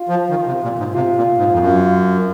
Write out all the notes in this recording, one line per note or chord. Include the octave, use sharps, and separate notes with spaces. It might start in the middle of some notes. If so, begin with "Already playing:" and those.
Already playing: F4
F3
D#3
C3
A#2
G#2
C3 F4
A#2
G#2
F2
F#2